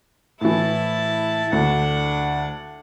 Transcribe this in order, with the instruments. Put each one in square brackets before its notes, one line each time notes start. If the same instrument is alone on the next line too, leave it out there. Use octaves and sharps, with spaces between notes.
[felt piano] A2 E3 [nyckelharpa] E4 A5
[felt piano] D2 [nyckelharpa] D4 F#5